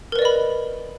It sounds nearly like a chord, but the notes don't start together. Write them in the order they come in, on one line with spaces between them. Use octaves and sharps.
A#4 B4 D5 D#5 B5